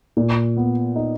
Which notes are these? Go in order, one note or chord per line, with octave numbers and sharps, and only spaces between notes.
A#2
B3
D#4